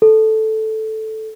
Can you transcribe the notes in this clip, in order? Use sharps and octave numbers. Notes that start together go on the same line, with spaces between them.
A4